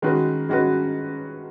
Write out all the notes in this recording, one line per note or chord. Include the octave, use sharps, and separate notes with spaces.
D#3 G#3 C#4 F#4 B4
D#3 G#3 C#4 F#4 B4